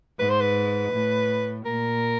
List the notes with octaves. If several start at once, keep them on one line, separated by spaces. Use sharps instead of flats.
G#2 B4
C5
B4
A2
A#2 A#4